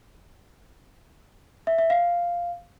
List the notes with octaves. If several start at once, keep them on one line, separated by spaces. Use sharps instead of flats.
E5
E5
F5